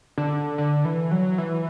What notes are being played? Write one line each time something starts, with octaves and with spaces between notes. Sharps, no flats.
D3
D3
E3
F#3
E3